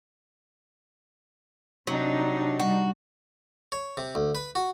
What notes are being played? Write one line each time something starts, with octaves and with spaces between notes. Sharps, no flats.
C3 F#3 D4 D#4
G3 F#4
C#5
C3
D2
B4
F#4